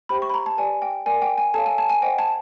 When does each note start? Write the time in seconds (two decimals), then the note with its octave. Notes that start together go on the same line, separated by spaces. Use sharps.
0.09 G4 C5 E5 G5 B5
0.22 C#6
0.30 B5
0.34 A#5
0.46 A5
0.58 G4 B4 D5 G#5
0.82 G5
1.06 A#4 D5 F#5 G#5
1.22 G5
1.38 G#5
1.54 A4 C#5 F5 A5
1.66 G#5
1.78 A5
1.90 G#5
2.02 C5 D#5 F#5 G5
2.19 A5